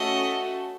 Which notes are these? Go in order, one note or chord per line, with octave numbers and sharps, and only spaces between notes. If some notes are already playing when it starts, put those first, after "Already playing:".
Already playing: A3 C#4 F#4 A4 D#5